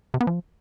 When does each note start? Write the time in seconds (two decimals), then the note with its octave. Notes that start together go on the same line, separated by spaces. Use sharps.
0.14 C3
0.21 B3
0.27 F3